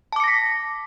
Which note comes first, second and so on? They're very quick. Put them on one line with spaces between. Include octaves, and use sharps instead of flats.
A5 D6 C#7 A#6 B6